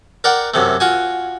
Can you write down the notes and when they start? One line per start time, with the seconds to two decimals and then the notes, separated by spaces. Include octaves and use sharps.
0.24 A#4 D5 F#5 G5
0.54 F#2 C3 A3
0.80 F4 F#4 G#5